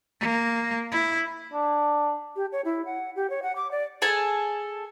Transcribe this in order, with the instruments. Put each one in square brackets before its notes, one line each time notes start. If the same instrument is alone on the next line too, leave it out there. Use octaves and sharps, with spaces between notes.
[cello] A#3
E4
[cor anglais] D4
[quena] G4
C#5
E4
F#5
G4
C#5
F#5
D6
D5
[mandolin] G#4 A4 G#5 A5